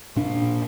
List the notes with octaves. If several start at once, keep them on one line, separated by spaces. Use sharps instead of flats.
A#2 D4